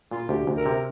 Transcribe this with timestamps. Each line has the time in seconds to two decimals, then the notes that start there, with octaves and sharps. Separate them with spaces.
0.11 A#2 F4
0.29 D2 G4
0.47 D2
0.57 A#4
0.66 C3